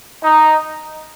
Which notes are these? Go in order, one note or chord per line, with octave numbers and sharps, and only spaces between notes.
D#4